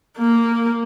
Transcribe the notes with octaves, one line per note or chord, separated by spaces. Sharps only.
A#3